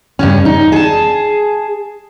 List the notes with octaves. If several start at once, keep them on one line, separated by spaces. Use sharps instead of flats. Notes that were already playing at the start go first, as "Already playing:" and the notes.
G2 C#3 C#4
D#4
G#4 A5